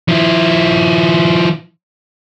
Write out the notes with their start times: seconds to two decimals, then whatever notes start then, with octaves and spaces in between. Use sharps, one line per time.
0.08 F3 E4